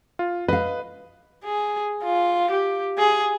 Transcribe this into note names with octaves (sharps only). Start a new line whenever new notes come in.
F4
B4 D#5 F5
G#4
F4
G4
G#4